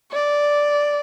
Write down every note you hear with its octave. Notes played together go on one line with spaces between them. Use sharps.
D5